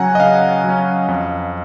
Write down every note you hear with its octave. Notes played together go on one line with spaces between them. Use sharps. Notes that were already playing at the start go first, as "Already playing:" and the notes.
Already playing: C#3 F#3 C#4 F#5 G#5 A#5
D#5
C#3 F5
F#3 C#4
F2